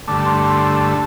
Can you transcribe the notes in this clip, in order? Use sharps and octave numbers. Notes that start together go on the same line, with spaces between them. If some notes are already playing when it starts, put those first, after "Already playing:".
G2 D3 A3 D6
C6
C6